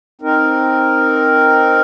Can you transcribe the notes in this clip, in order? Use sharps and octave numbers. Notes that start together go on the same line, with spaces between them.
C4 D#4 A#4